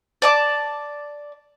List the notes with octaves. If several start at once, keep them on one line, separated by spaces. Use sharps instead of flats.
D5 A5 D6